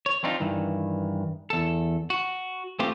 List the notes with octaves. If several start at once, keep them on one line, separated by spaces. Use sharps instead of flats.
C#5
C4 D4 D#4 F4
G2 D#3 E3
E2 A4
F#4
A3 C4 F4 G4